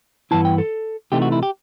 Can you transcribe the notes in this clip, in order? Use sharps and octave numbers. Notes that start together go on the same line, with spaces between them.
G2 E3 B3 E4 A5
G5
A4
C3 E3 A3 D#4 G4
F#4
E4
G4